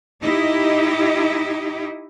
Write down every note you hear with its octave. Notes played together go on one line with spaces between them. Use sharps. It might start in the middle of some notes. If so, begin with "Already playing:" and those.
D#4 E4 G4 D#5